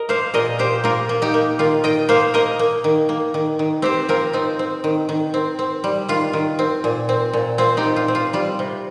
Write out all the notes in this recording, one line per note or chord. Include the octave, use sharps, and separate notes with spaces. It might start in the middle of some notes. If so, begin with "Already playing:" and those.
Already playing: A#4 D#5
A#3 C5 F5
A#2 A#4 D#5
A#3 G4 C5
A#3 F4 A#4
A#3
D#4 G4
A#3
D#3 F4
D#3 D#5 G5
A#3 C5 F5
A#3 A#4 D#5
A#3
D#3
A#3
D#3
D#3
C4 G4 C5
C4 F4 A#4
C4 D#4
C4
D#3
D#3
C4
C4
G3
D#3 F4
D#3
C4
A#2
C4
A#2
C4 F4
D#4 G4
A#2
F4
C4
F4
G3 F4
C3